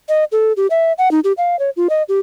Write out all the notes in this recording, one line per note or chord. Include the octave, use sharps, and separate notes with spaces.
D#5
A4
G4
E5
F#5
D#4
G4
F5
C#5
F4
D#5
G4